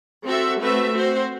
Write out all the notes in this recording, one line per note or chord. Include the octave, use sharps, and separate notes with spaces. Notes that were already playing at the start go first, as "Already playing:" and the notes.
C4 F#4 A4 E5
A3 C4 F#4 B4 E5
C4 F#4 C5